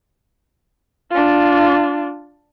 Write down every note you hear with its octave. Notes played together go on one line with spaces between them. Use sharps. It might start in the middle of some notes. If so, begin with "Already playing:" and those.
D4 F4